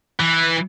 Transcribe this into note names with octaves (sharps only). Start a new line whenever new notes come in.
E3